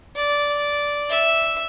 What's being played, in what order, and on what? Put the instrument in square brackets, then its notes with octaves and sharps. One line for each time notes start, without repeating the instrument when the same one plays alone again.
[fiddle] D5
E5